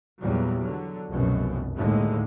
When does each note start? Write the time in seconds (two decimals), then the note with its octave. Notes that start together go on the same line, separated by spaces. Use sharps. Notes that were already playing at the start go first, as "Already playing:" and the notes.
0.22 E2 A#2 F#3 G3
0.59 D3 F#3
1.09 F1 C2 F#2 B2
1.75 D#2 A2 D3 G#3